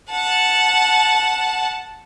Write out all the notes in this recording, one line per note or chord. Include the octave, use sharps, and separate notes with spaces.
F#5 A5